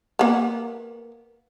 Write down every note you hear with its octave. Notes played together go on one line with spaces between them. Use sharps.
A#3 B3